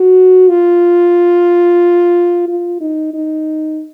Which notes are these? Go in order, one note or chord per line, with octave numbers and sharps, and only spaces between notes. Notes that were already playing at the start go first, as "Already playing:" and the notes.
Already playing: F#4
F4
F4
D#4
D#4